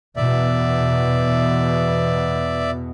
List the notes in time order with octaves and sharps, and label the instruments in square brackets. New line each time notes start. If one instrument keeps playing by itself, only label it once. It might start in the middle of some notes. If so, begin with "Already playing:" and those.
[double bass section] E2 B2 [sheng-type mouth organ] D5 E5